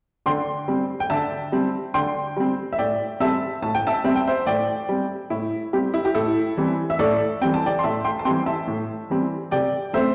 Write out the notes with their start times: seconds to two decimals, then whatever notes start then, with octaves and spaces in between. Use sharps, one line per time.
0.26 D3 G5 C6
0.68 G3 C4
1.00 G5
1.10 D3 E5 A5
1.52 G3 C4
1.94 D3 G5 C6
2.36 G3 C4
2.73 E5
2.78 A2 D5 G5
3.20 G3 C4 E5 A5
3.62 A2 A5
3.75 G5
3.87 E5 A5
4.04 G3 C4 E5
4.16 G5
4.28 C5 E5
4.46 A2 D5 G5
4.89 G3 C4
5.30 A2 E4
5.73 G3 C4 G4
5.94 E4
6.05 G4
6.14 A2 E4 A4
6.57 E3 G3 C4
6.90 E5
6.99 A2 A4 D5
7.41 E3 G3 C4 G5
7.54 A5
7.66 D5 G5
7.79 C6
7.83 A2 E5 A5
8.04 G5 C6
8.19 A5
8.25 E3 G3 C4 G5 C6
8.46 E5 A5
8.67 A2
9.10 E3 G3 C4
9.51 C3 D5 G5
9.93 A3 C4 C5 E5